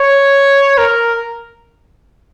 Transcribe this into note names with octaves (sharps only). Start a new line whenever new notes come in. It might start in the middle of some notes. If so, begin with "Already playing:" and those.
Already playing: C#5
A#4